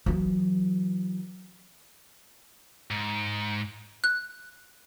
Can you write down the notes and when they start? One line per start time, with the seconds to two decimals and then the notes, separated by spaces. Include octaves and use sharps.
0.06 E3 F#3
2.91 G#2
4.04 F#6